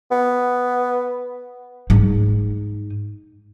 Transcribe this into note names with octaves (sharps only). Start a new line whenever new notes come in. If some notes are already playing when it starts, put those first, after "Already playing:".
B3
G#2 D#4